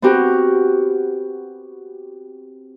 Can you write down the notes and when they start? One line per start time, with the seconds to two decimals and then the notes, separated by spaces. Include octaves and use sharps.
0.02 B3 C4 F#4 G4 A#4